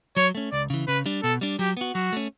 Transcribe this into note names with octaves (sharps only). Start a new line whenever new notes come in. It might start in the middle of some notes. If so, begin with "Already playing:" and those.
F#3 C#5
A3 C#4
C#2 D5
C#3 E3
C#3 B4
G3 D4
B2 A4
G3 D4
F#3 G4
B3 F#4
F#3 F#4
A3 C#4